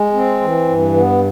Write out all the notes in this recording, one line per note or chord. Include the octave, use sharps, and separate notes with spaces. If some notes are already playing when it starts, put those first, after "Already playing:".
Already playing: G#3
C4
E3
G2
B3